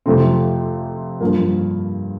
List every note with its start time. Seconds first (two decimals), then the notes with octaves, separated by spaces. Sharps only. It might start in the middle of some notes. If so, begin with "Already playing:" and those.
0.06 F2 C3 F3 A3 C4
1.20 G2 F3 A#3